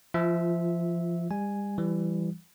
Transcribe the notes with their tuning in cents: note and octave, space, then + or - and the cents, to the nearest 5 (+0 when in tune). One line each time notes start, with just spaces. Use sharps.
F3 -25 F4 +0 E5 -10
G3 +40 G#5 +0
E3 +20 G3 +0